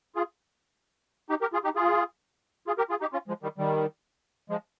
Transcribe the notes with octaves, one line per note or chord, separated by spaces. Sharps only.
F4 G#4
D#4 G4
G4 A#4
F4 G#4
D#4 G4
F4 G#4
F4 G#4
G4 A#4
F4 G#4
D#4 G4
C#4 F4
F3 G#3
D#3 G3
D#3 G3
F3 G#3